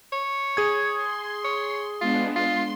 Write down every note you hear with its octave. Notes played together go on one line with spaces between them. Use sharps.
C#5
G#4 G#6
C6
C#5
G#3 B3 D4 F4
F4 C6